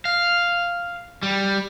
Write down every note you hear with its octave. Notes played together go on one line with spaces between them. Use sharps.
F5
G3